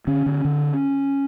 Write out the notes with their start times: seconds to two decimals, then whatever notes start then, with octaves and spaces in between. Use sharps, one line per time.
0.07 D3 C#4
0.26 D3
0.45 D3